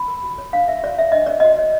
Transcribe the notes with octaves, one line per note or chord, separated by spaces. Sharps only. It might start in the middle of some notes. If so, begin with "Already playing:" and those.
Already playing: B5
A#4
F#4
C#5
D4 F5
A#4 E5
F#4 D5
C#5 E5
D4 D#5
A#4 D5
F#4 D#5
C#5